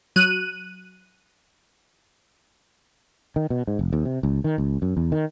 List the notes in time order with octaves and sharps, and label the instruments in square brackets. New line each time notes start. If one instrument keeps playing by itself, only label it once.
[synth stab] F#3 F#6 D#7
[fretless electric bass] D#3
B2
G#2
F1
D#2
C3
C#2
D#3
C#2
F#2
E2
D#3